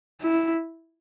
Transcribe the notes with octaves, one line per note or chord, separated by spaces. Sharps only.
E4